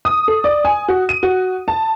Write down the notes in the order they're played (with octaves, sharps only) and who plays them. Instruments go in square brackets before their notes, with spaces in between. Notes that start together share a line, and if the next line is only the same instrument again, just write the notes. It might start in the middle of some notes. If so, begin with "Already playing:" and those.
[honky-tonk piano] D#6
A4
D5
G#5
F#4
D#7
F#4
A5